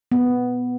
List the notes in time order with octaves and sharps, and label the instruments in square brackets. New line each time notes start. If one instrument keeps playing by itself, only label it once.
[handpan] B3